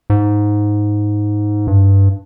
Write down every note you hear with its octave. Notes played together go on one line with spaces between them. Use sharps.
G#2
G2